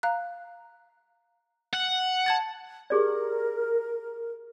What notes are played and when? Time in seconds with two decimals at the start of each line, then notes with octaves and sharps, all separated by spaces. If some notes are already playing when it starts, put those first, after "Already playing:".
0.03 F5 A#5 F#6
1.74 F#5
2.26 A5 G#6 A6
2.90 G4 G#4 A#4 D5